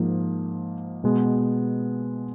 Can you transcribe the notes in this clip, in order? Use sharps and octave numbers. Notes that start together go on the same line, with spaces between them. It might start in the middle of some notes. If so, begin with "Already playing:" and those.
Already playing: G#2 F3 A#3
B2 G#3 B3